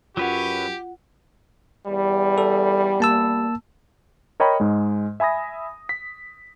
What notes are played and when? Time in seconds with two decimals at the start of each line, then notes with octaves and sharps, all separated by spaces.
0.17 F#2 F#3 F4 G4 B4 C#5 F#5
1.87 E2 G3
2.38 A4
3.00 A#3 A5 E6
4.40 A#4 C#5 D#5 G5 A#5 B5
4.60 G#2 G#3
5.20 E5 G#5 B5 D#6 A#6
5.89 B6